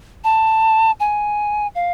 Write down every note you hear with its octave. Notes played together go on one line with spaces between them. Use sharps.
A5
G#5
F5